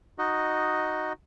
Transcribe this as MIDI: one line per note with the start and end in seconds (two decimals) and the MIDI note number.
0.18 1.13 63
0.18 1.13 66
0.18 1.13 75